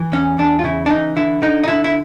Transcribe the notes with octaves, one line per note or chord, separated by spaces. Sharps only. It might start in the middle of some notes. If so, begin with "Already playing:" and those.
Already playing: E3
E2 C#4
E2 D4
F4
C#3 E4
D4
E3 D#4
D3 E4
D3 D#4
D#4
D3 E4
E4